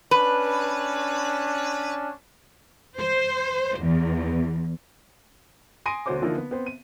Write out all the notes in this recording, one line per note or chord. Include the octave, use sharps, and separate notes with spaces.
C#4 D4 B4
C5
E2
G#5 C6 D#6 A#6 D7 D#7
D2 B2 F#4 C5 C#5 D6
D3 E3 F3 A#3 D#4 E4
B3
B3 C4 C5
D#7